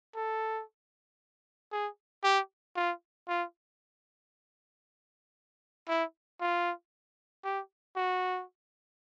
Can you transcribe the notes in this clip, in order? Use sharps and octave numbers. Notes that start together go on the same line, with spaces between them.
A4
G#4
G4
F4
F4
E4
F4
G4
F#4